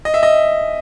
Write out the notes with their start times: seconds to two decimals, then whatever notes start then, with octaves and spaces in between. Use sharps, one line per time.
0.05 D#5
0.14 E5
0.23 D#5